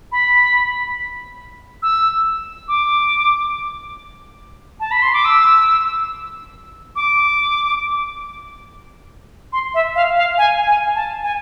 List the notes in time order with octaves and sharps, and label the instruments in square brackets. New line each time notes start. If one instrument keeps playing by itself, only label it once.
[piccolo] B5
E6
D6
A5
B5
C6
D6
E6
D6
C6
E5
F5
F5
G#5
G#5
A5
G#5